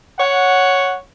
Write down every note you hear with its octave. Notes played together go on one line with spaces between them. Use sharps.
C#5 F#5